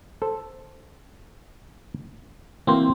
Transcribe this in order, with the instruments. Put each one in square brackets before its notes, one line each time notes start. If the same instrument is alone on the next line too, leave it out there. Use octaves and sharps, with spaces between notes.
[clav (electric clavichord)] A4 C5
[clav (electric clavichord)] E3 A#3 F#4 [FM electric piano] C4 C5